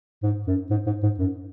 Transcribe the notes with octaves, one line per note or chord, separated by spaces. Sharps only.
G#2
F#2
G#2
G#2
G#2
F#2